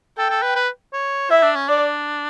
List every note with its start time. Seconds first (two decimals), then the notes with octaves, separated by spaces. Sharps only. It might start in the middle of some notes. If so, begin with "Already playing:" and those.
0.18 A4 G5
0.30 A4
0.43 B4
0.55 B4
0.93 C#5
1.30 E4 E5
1.43 D4
1.55 C#4
1.68 D4 D5